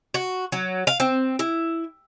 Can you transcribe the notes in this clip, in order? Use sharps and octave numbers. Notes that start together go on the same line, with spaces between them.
F#4
F#3
F5
C4
E4